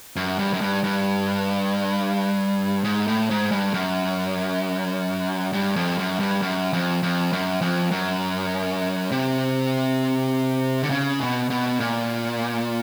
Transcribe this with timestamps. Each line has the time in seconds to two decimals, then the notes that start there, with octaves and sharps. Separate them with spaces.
0.16 F#2
0.39 G2
0.53 F#2
0.61 G2
0.84 G2
2.84 G#2
3.07 A2
3.30 G#2
3.51 G2
3.74 F#2
5.53 G2
5.76 F2
5.98 F#2
6.20 G2
6.42 F#2
6.73 F2
7.03 F2
7.33 F#2
7.61 F2
7.91 F#2
9.11 C3
10.83 D3
10.90 C#3
11.20 B2
11.50 B2
11.80 A#2